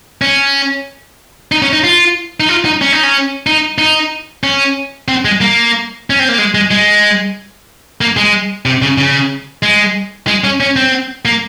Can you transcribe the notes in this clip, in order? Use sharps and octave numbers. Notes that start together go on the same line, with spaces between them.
C#4
D#4
C#4
D#4
F4
D#4
F4
D#4
C#4
D#4
C#4
D#4
D#4
C#4
C4
G#3
A#3
C#4
C4
A#3
G#3
G#3
G#3
A#3
G#3
C3
C#3
C#3
G#3
G#3
C#4
C#4
C4
A#3